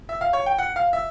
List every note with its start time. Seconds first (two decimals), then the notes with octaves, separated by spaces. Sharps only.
0.09 E5
0.21 F5
0.33 C#5
0.46 G5
0.59 F#5
0.76 F5
0.93 E5